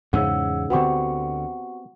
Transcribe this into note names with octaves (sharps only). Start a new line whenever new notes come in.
E2 G#2 C#3 C#4 F#5 E6
D2 D3 B3 C4 F#4 G4 F#5 C#6